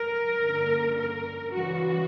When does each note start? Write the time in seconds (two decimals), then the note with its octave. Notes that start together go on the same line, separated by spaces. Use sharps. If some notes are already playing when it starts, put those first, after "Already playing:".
Already playing: A#4
0.42 G2 D3 A#3 C#4
0.98 A#4
1.53 C#3 E3 G3 F#4